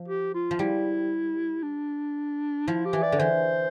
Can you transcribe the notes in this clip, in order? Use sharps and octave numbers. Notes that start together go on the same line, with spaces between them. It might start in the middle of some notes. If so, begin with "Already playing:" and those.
Already playing: F3
G4
F4
F3
G3 E4
D4
F3 E4
G4
E3
D5
D3
E3 C5